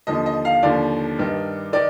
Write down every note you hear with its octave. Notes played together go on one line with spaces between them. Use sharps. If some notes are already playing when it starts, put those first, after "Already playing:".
D#2 D3 F3 D#5
D#5
F5
D#2 D3 F3 D5
G2 D#3
D#3 D5